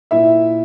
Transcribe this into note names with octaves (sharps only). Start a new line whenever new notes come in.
A#2 E4 E5